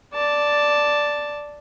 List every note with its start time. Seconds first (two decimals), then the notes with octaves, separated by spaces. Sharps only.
0.14 D5 A5